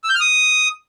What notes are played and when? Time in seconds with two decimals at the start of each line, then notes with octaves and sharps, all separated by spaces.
0.04 E6
0.09 G6
0.15 F6
0.20 D#6